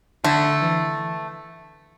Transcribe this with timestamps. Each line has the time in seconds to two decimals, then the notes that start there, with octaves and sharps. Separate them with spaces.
0.24 D3 A3
0.61 E3